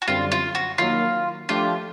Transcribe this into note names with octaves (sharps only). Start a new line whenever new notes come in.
F#4
F#2 D3 G3 C4 F4
F4
F#4
D#3 F#3 A#3 F4
F3 A3 D4 F4 G4